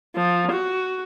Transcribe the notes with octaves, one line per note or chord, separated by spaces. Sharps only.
F3
F#4